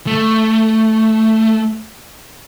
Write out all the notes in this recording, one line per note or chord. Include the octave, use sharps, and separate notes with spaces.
A3